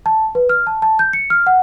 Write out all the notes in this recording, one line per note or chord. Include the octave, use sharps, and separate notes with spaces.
A5
B4
F6
A5
A5
G6
C#7
F6
F#5